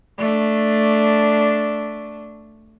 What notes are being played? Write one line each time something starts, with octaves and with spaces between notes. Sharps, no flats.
A3 D4